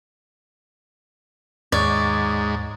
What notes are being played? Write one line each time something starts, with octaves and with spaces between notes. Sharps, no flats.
D#2 G#2 C#5 D5